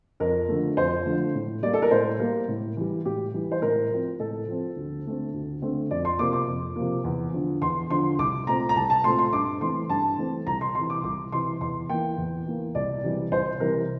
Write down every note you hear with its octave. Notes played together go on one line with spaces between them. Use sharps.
F2 A#4
D3 F3 A3
F2 C5
D3 F3 A3
A2
G3 A#3 D5
A4
A#4
A2 C5
G3 A#3 A#4
A2
E3 G3
A2 G4
E3 G3
C5
A2 A#4
F3 C4
A2 A4
F3 C4
D2
D3 A3 C4
D2
D3 A3 C4
F2 D5
C6
C3 F3 A#3 D6
D6
F2
C3 F3 A#3
E2
D3 F3
E2 C6
D3 F3 C6
C2 D6
A#2 A3 C4 A#5
A#5
C2 A5
A5
A#2 A3 C4 C6
C6
G2 D6
E3 A3 C4 C6
G2 A5
E3 A3 C4
C2 A#5
C6
C3 E3 C6
D6
C2 D6
C3 E3 C6
E2 C6
E3 A#3 G5
E2
E3 A#3
C2 D5
C3 E3 G3
C2 C5
C3 E3 G3 A#4